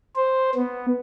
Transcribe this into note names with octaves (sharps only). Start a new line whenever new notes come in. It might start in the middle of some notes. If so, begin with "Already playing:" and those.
C5
B3